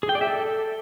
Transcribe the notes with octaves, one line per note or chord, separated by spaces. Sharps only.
G#4
G5
D5
E5
A4